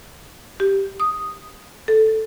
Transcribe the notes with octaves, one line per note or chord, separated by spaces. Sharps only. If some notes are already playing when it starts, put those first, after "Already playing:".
G4
D#6
A4